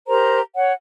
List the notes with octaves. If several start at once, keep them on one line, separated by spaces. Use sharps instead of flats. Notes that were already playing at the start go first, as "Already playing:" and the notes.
G4 A#4 C5 A#5
C#5 F#5